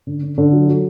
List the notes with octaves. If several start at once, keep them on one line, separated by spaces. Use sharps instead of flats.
D3
D3
D3
F#3
F#3